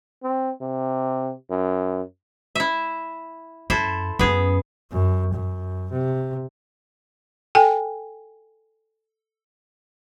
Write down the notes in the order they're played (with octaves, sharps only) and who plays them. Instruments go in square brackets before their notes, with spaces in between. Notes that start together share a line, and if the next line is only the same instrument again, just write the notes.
[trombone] C4
C3
F#2
[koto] E4 E5
[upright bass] F#2 [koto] E4 A4 C5
[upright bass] F#2 C#4 [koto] B3 G#4
[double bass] F#2
F#2
C3
[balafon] A4 G5 G#5